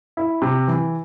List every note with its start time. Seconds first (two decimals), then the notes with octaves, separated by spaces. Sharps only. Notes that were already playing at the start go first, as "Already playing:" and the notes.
0.17 E4
0.42 C3
0.68 E3